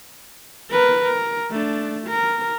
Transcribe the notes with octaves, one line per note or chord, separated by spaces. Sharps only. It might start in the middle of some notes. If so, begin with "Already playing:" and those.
A#4 B4
A#4
A3 D4
A#4